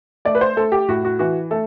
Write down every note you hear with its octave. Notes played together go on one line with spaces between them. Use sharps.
A3 D5
B4
C5
A3 A4
G4
A2 F#4
F#4
E3 F#4
A3 A4